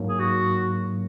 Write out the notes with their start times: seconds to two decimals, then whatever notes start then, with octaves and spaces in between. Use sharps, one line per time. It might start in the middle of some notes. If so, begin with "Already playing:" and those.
Already playing: G#2 F#3 A#3
0.09 G#4
0.20 F#4